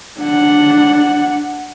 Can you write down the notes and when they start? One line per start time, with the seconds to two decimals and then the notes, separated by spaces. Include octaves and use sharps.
0.20 D4 F#5